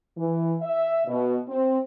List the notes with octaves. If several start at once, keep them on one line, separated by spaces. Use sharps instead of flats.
E3
E5
B2
C4